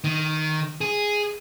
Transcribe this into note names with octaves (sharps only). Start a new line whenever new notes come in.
D#3
G#4